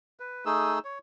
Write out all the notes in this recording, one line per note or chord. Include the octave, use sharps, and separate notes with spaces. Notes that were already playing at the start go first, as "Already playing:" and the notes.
B4
A3 D#4 G#4 E6
C#5